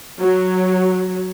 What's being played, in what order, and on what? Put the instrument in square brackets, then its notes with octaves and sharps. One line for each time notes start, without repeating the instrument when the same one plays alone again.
[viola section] F#3